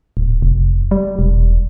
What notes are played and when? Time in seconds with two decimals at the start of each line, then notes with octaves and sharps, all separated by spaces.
0.17 D1
0.42 F1
0.91 G3
1.19 E1